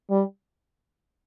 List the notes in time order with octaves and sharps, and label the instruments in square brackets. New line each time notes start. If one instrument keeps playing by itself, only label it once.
[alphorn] G3